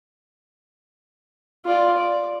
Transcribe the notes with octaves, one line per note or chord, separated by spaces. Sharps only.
F4 D5
D5